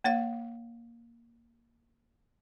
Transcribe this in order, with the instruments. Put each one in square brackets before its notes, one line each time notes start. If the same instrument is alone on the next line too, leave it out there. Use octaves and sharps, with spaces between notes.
[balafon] A#3 C#5 F5